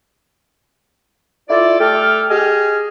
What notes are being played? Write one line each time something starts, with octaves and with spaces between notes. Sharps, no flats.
E4 F4 A4 D5
A3 G4 A4 G5 F6
G4 G#4 D#5 G#5 F6